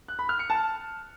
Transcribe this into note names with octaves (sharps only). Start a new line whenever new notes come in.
F#6
B5
F6
C#7
A5